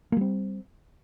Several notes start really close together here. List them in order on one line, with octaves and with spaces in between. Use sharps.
A#3 G3 C4